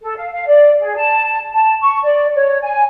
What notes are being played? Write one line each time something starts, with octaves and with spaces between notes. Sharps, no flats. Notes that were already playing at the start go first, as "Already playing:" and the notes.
A4
F5
F5
D5
G#4
A5
A5
C#6
D5
C#5
G#5